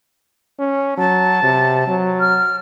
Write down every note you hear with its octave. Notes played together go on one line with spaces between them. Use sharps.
C#4
F#3 A5
C3
F#3
F6